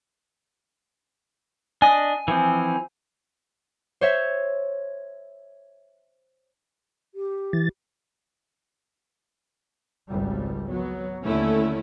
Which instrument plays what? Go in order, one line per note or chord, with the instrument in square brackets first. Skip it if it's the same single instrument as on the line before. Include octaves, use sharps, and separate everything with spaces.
[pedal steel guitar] D4 D#5 [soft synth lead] G#5
[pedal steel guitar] E3 F3 C4
[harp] C5 C#5 E5
[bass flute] G4
[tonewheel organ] E3 A6
[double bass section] G#1 C#2 G3
[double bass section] F#3 [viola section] B3
[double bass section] D#2 D3 [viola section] A3 C#4 E4